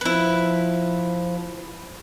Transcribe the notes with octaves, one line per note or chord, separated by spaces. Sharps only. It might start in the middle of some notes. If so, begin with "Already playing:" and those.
F3 E4 B4